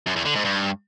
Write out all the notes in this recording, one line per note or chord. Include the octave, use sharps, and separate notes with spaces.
F#2
E2
D3
G#2
G2